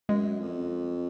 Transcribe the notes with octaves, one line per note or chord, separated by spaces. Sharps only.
F#2 G#3
F2